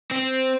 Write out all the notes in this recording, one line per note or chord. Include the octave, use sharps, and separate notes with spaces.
C4